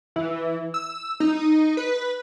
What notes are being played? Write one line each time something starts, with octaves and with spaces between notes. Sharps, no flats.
E3
E6
D#4
B4